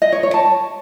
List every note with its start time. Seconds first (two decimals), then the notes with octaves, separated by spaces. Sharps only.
0.02 D#5
0.12 C#5
0.23 C#5
0.34 A5